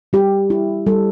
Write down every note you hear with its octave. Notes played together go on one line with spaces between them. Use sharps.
G3 G4
E4
G3 A4